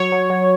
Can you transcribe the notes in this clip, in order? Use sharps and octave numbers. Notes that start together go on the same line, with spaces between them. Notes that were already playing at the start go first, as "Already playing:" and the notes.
Already playing: F#3 C#5
F#3
F#3